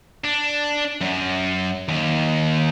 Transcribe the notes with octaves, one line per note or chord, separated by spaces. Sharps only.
D4
F#2
D#2